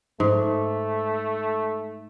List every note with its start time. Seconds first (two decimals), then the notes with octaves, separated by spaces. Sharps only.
0.20 G#2 A3